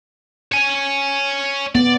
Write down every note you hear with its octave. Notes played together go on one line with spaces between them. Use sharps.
C#5 G#5
B3 D5